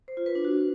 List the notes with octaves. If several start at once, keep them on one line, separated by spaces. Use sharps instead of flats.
C5
F4
B4
D4
F#4